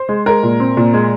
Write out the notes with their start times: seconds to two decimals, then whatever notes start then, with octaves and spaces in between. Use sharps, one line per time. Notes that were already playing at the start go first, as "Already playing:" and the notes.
Already playing: C5
0.09 G#3
0.26 G#3 A#4
0.43 A#2
0.60 C4
0.77 A#2
0.93 G#3